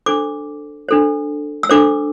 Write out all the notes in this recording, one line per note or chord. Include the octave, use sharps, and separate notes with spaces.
D4 A4 C5 D6
D4 A4 C5
E6
D4 A4 C5 D6